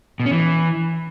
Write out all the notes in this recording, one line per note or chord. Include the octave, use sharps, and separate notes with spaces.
B2
C#4
E3